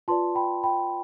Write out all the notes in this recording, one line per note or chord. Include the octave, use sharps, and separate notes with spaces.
F4 B4 D5 A5 C6
G5 B5
G5 B5